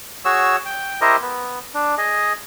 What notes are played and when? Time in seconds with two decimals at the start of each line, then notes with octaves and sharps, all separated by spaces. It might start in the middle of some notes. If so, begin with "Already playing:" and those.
0.25 F#4 G#4 C#5 E6
0.65 G5
1.01 E4 G4 A#4 C5 D#5
1.21 B3
1.74 D4
1.98 G#4 D#5